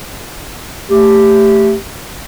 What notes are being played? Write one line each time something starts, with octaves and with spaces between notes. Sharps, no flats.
A3 G4